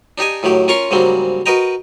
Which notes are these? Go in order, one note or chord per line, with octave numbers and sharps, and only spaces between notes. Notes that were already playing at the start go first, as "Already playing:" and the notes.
D4 D#4 G4 D#5 G#5
A2 D#3 F#3 G4
C#4 F4 A#4 A#5 C6 C#6
G#2 C#3 F#3 G3 A#3 C4
F#4 A#4 B4 D#5 G5 A#5